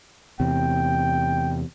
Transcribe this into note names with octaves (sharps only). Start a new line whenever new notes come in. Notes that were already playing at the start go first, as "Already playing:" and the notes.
E2 C3 G5